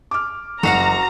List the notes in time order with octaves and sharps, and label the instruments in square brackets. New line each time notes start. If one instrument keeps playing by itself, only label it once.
[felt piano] D6 F6
[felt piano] F#1 [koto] F#4 F5 F#5 [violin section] A#5